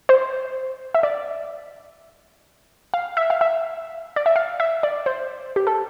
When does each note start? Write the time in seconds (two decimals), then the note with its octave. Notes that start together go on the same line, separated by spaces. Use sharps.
0.09 C5
0.94 E5
1.03 D5
2.94 F5
3.17 E5
3.30 F5
3.41 E5
4.16 D5
4.26 E5
4.36 F5
4.60 E5
4.83 D5
5.06 C5
5.56 G4
5.67 A4